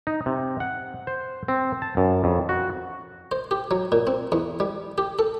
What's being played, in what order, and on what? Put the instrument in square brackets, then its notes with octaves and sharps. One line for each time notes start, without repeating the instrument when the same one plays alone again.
[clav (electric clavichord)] D#4
C3
F#5
C5
C4
A5
F#2
F2
F#4
[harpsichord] C5
G4
F#3
A#2
C4
E2
G3
G4
A4